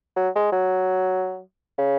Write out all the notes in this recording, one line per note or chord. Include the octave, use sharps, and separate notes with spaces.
F#3
G#3
F#3
C#3